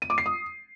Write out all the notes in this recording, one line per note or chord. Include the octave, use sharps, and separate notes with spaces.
D#7
D6
C7
D#6